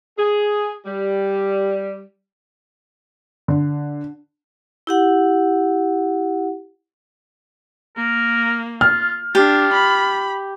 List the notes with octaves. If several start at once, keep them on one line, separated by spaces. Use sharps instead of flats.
G#4
G3
D3
E4 G4 F#5
A#3 A#4
F4 F6
D4 F4 G4
B5